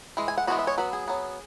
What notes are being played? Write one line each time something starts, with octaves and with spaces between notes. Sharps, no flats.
E3 G#3
G#5
F#5
E3 G#3 B3 F#4
E5
C#5
F#3 B3 B4
G#4
F#3 B3